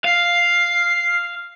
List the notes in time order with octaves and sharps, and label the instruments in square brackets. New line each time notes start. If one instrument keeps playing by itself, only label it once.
[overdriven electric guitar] F5 [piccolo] C7